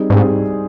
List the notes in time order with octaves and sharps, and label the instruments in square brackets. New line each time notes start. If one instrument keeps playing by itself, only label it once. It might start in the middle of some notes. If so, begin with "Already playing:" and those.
Already playing: [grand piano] G3 C4 D#4 G#4
[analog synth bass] G#2 [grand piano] G3 C4 D#4 G#4